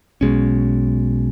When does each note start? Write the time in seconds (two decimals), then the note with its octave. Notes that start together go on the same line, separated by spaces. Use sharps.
0.21 B1 B2 G#3 C#4